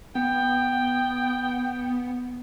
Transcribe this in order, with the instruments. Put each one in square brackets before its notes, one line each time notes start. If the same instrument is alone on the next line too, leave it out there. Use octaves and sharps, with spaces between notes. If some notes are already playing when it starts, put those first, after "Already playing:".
[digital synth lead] B3 [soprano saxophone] G5